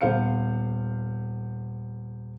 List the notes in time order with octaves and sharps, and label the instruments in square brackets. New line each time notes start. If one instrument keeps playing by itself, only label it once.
[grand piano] D#1 B3 C5 F5 C#7